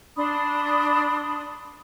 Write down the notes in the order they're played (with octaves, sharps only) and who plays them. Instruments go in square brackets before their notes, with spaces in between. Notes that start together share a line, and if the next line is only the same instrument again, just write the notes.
[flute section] D4 B5 C6 D#6